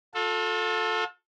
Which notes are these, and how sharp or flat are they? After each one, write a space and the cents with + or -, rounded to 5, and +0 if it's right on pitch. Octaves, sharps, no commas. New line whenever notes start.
F4 +40 A4 +0